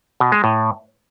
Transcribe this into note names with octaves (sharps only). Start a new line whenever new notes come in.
B2
G#3
A2